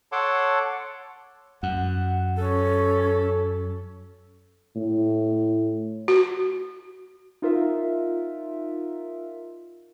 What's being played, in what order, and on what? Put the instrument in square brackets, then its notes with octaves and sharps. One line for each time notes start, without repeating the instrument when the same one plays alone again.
[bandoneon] A4 C#5 F#5 A5 C6 D6
[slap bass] F#2 [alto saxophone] F#5
[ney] C#4 [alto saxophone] A4
[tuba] A2
[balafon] F#4
[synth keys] D#4 F4 A#4 E5